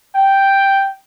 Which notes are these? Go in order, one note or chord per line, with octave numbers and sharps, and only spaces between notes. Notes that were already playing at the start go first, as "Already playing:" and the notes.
G5